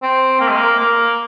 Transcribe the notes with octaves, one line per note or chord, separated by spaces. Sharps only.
C4
A#3
G#3
A#3
A#3